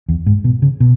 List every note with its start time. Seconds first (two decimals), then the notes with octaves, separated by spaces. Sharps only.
0.09 E2
0.26 G#2
0.44 B2
0.62 C#3
0.80 B2